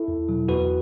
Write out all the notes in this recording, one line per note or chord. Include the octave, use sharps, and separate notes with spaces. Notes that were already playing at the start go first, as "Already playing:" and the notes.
Already playing: E4 A4
E2
B2 F#3
E2 F#4 B4